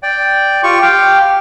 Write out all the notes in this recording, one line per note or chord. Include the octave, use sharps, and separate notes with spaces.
D5 G5
F4 G4 C#6
G4 F5 G5